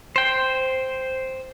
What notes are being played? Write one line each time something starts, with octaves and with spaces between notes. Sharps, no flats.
C5 G5